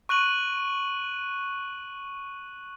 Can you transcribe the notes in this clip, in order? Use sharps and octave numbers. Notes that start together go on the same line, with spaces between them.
C#6 F#6 D#7 F#7